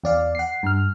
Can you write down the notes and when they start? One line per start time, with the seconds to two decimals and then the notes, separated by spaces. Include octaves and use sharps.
0.04 E2 D5 F5
0.35 F#5 C7
0.63 G2 F6